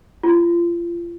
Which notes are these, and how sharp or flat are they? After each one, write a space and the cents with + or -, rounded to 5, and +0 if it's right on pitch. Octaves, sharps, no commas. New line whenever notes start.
F4 -35